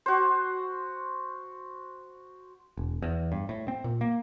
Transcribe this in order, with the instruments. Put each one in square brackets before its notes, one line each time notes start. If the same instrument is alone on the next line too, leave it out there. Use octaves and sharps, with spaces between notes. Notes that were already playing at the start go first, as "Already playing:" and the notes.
[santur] F#4 C5
[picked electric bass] E1
E2
G2
A2
C4
A#2
A#3